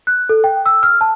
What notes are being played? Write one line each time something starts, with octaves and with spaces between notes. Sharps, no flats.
F#6
A4
G5
E6
F6
A5